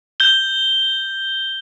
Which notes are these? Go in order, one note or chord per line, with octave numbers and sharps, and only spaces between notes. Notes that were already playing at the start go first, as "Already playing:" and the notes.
G6 G7